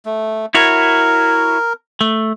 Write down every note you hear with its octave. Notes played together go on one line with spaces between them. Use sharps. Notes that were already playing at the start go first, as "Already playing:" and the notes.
A3
E4 F#4 A#4 C#5
A3